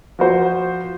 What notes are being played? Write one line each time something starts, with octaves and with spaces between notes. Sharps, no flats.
F3 F#4 C5